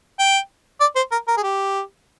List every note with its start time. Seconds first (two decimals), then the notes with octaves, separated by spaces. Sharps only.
0.19 G5
0.81 D5
0.96 C5
1.12 A#4
1.28 A#4
1.37 G#4
1.43 G4